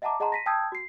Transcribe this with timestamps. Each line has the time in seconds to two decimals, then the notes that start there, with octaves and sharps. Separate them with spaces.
0.02 D#5 E5 F#5 A5 A#5 D6
0.20 G#4 D#5 F#5 A5 A#5 C6
0.32 A#6 B6 D#7
0.46 G5 A5 D#6 E6 G6 G#6
0.72 F#4 C7